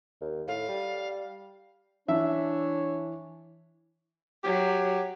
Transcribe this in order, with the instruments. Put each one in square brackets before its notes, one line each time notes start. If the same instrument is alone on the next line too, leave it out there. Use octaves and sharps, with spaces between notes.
[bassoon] D#2
[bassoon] A2 [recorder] F5
[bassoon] G3
[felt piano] E3 [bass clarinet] D4 [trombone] C#5 [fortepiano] E5
[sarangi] F#3 [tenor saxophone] G4